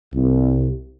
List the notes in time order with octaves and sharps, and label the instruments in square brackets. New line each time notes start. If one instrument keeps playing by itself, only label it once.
[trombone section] C2